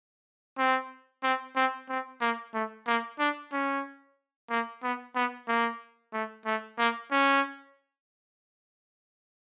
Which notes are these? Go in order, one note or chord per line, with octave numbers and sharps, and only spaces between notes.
C4
C4
C4
C4
A#3
A3
A#3
D4
C#4
A#3
B3
B3
A#3
A3
A3
A#3
C#4